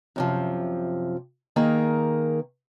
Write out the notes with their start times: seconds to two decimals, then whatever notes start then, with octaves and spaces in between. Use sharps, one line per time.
0.16 F#2 C3 F3
1.56 D#3 A#3 G#4 A#4